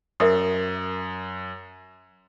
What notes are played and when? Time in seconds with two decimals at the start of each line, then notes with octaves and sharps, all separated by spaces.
0.20 F#2 A#4 E5 D#6